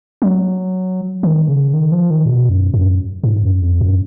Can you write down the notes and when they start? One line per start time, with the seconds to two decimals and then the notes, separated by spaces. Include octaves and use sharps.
0.22 F#3
1.23 D#3
1.49 C#3
1.73 D#3
1.92 F3
2.10 D#3
2.26 A#2
2.30 B2
2.49 F#2
2.74 F#2
3.23 G#2
3.43 F#2
3.61 F2
3.81 F#2